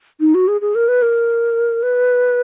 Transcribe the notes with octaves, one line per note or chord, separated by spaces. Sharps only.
D#4
F#4
G#4
G#4
A#4
B4
A#4
B4